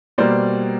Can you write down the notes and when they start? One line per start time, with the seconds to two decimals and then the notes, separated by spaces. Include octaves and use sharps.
0.18 B2 G3 A#3 C5 D5